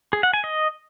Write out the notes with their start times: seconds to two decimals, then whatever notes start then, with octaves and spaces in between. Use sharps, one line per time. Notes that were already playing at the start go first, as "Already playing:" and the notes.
0.13 G#4
0.23 F#5
0.34 G#5
0.44 D#5